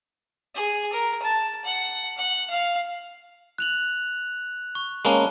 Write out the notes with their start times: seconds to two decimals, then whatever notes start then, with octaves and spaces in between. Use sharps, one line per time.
0.55 G#4
0.93 A#4
1.23 A5
1.65 F#5
2.17 F#5
2.50 F5
3.58 F#6 F7 F#7
4.75 C#6
5.05 G#3 A#3 C#4 A5 B5 G7